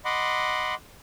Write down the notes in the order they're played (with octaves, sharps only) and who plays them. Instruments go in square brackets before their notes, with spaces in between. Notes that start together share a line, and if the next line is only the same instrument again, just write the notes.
[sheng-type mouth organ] D#5 F#5 B5 C6 D6